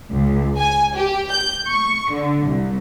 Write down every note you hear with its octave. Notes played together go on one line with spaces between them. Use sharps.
C#2
G#5
G4
G6
C#6
D3
C2